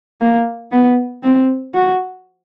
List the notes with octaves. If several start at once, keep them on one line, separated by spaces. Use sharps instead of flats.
A#3
B3
C4
F#4